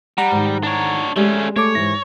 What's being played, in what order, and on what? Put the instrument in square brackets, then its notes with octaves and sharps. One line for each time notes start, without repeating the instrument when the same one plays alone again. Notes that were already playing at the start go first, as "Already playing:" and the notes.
[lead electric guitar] G3 [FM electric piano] F#5 A#5
[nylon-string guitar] G#2 D#3
[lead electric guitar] D4 C#5
[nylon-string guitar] G#3 G4 D5 [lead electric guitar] A3 C#4
[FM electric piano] A3 A4 D6 [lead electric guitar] C#5
[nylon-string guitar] G#2 E3 E4 [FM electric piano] A#6